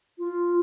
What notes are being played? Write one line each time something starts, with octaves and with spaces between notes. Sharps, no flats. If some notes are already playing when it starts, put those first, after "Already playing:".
F4